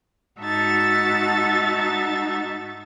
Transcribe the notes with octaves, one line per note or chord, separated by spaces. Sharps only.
G#2 D#4 F#4 E5 A5 A6